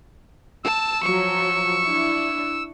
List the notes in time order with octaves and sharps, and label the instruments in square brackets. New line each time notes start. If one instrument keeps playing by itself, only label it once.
[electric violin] A5 [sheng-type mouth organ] E6
[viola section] F3 F#3 [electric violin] C#6
[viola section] D4 E4